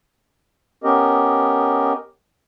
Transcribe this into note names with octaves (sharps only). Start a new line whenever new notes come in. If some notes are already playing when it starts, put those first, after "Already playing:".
B3 C#4 G4 A#4 D#5